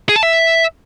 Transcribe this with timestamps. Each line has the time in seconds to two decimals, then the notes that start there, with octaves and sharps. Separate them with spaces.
0.09 G#4
0.16 A5
0.23 E5